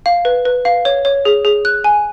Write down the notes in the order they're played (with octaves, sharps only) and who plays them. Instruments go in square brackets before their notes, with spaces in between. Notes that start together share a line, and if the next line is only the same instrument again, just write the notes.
[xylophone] F5
B4
B4
F5
C#5
C#5
G#4
G#4
F#6
G#5